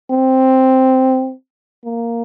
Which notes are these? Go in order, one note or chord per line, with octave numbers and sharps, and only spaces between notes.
C4
A#3